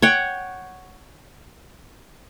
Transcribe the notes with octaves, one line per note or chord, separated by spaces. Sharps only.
C#5 F#5 G5